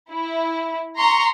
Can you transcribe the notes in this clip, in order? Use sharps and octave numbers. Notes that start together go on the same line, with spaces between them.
E4
A#5 C6 C#6